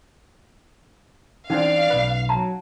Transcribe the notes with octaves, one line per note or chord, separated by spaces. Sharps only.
E3 C4 C#4 D#4 D5 F5
B1 B4
F#3 A5 A#5